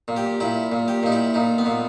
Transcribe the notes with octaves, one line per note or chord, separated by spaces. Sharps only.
A#2
G4
A#2 E4
A#2
G4
A#2 D#4
E4
A#2 D#4
B3
A#2